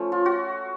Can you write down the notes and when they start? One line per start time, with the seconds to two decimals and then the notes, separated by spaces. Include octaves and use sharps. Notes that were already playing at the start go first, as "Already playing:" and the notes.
Already playing: F3 A3 C#4
0.12 F4
0.26 F#4